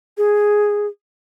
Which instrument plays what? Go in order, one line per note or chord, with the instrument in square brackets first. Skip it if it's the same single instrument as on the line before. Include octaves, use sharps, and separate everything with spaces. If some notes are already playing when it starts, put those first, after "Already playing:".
[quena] G#4